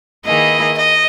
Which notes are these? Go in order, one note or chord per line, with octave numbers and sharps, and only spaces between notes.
D#3 A#3 E4 G#4 B4 D#5
D#5